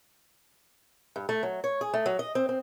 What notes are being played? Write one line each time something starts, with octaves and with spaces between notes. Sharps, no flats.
G2
A3
F#3
C#5
G#4
A3
F#3
D#5
C4
C4